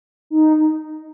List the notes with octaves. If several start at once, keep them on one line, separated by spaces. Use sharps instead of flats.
D#4